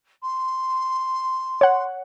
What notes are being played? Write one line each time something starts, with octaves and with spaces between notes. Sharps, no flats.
C6
C#5 F#5